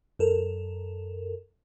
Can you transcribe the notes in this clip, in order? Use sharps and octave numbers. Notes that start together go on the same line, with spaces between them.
F#2 A4 A#4